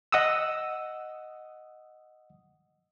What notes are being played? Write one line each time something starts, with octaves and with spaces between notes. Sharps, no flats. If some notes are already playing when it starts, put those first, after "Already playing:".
D#5 F#5 D#6 E6